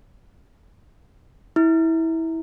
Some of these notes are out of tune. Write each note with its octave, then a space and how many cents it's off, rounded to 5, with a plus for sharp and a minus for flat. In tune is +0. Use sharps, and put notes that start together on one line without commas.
E4 -20